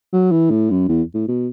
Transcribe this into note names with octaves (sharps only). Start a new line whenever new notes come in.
F#3
E3
A2
F#2
E2
A2
B2